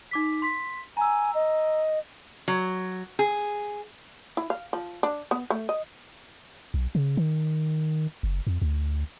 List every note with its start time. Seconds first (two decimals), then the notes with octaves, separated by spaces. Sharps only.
0.11 D#4 D6 B6
0.42 C6 B6
0.97 G#5 A#5 E6
1.35 D#5
2.48 F#3
3.19 G#4
4.37 E4
4.50 F5
4.73 F3
5.03 D4
5.31 B3
5.50 A3
5.69 D#5
6.74 B1
6.95 C#3
7.17 D#3
8.23 F#1
8.47 F2
8.62 D2